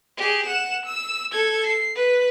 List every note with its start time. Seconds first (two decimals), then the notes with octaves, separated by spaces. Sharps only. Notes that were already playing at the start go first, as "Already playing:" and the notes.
0.17 G4 G#4
0.46 F#5 E7
0.85 E6
1.32 A4 G#6
1.66 C7
1.95 B4